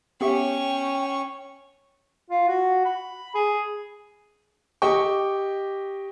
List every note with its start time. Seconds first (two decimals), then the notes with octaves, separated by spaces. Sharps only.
0.21 B3 C#4 G4 E5 G5 C#6
2.30 F4
2.48 F#4
2.85 B5
3.35 G#4
4.82 G4 D#5 G5 C#6